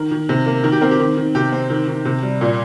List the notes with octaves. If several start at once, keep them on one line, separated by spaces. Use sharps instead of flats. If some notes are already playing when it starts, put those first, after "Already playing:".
Already playing: D#3 A#4
D#3
C3
A#3
D#3 A#4
G4
C4 A#4
G4
D#3
D#3
C3 G4
C4
D#3
D#3
C3
G3
A#2